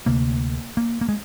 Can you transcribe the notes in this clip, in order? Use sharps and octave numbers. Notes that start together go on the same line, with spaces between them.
D2 C3 A#3
A#3
A#3
G#3